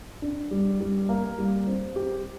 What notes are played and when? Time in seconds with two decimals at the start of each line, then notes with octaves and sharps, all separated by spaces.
0.22 D4
0.51 G3
0.80 G3
1.09 A#3
1.38 G3
1.67 C4
1.96 G4